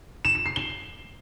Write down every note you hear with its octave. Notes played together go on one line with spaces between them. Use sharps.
E7
E7
C7
G7